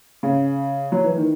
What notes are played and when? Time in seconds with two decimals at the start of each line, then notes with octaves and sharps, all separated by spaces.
0.23 C#3
0.92 F#3
1.04 E3
1.16 D#3